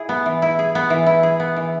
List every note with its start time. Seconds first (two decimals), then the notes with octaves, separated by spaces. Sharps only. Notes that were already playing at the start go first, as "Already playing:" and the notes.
Already playing: E4 G#4
0.09 B3
0.26 E3
0.42 E4
0.59 G#4
0.75 B3
0.90 E3
1.07 E4
1.23 G#4
1.40 B3
1.57 E3